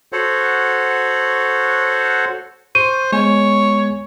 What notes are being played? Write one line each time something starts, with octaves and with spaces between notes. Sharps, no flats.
F#4 A4 C5 C#5 F#5
C5 C#6 D#7
G#3 B3 C#5 G#5